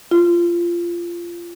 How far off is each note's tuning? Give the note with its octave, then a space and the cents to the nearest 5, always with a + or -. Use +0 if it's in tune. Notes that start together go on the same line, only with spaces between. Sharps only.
F4 -20